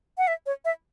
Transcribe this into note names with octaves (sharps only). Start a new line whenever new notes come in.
F#5
E5
C#5
E5